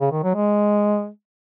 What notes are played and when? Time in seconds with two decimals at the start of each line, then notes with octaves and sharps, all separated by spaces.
0.01 C#3
0.12 D#3
0.23 F#3
0.35 G#3